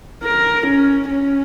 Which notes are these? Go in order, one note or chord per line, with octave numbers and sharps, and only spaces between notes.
A#4
C#4
C#4